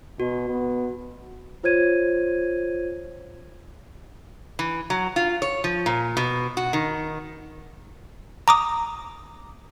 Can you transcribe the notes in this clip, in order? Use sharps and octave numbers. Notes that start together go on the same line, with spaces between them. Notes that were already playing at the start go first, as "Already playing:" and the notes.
B2 F#4
B3
F4 C5 C#5 G#6 D#7
E3
F#3
F4
C#5
F3
A#2
B2
F#4
D#3
A#5 D6 D#6